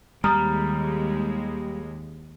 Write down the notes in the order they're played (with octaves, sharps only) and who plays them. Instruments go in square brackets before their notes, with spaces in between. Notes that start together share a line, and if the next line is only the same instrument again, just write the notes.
[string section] D#2 G#3 [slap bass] G3 [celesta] A#5 D#6 F6